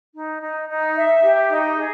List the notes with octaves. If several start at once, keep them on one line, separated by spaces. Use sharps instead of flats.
D#4
D#4
D#4
E5
G4
D#4
G#4